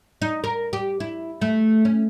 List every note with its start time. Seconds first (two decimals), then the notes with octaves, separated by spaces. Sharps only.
0.22 D#4
0.44 A#4
0.73 G4
1.00 E4
1.41 A3
1.85 C#4